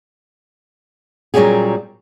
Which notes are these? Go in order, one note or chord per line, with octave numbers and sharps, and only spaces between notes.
A#2 F#3 G3 C#4 G4 G#4